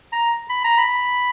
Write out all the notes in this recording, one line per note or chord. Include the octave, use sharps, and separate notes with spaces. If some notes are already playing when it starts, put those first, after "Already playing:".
A#5
B5
A#5
B5